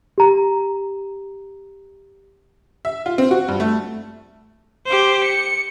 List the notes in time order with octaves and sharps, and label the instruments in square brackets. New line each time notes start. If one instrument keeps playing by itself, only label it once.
[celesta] G4 A#5
[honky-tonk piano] E5
F4
C4
F#4
G2
A3
[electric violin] G4 C5
C#7